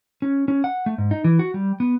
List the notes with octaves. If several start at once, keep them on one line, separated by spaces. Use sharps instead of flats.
C#4
C#4
F#5
A3
G#2
D#4
E3
F#4
G3
B3